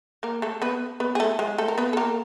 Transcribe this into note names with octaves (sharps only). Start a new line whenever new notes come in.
A#3 A#4
A3 A4
B3 B4
B3 B4
G#4
A3 A4
G#3 G#4
A3 A4
A#4
B3 B4
A4
A#3 A#4